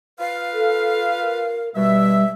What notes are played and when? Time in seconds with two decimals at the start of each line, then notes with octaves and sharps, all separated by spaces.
0.20 F4 B4 F5
0.53 A4
1.21 A#4
1.75 B2 G3 E5